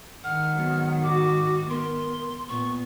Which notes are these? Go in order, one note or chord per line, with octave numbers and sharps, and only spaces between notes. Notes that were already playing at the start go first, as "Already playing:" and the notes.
G#2 D#3 F#5 F6
F#3 B3
F#4 D6
B3 A#4 C6
A#2 B3 C#6